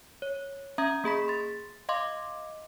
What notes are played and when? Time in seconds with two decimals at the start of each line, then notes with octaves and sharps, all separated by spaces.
0.22 C#5
0.78 C#4 E5 A#5 D#6 G#6
1.04 A#3 G#4 B5 B6
1.28 C6 A6
1.89 D#5 F5 C6 D6